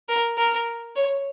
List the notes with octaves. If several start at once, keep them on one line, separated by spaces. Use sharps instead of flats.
A#4
A#4
C#5